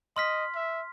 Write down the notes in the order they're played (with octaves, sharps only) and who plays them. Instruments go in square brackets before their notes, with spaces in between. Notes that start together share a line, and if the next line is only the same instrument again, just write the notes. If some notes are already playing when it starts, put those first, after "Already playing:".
[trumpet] D#5 [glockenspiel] C6 F6 B6
[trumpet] E5